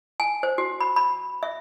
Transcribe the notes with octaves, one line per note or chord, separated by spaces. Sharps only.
G#5
C5
F#4
B5
B5
E5